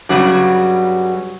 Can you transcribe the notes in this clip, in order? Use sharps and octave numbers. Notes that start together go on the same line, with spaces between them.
G2 C#3 F#3 G3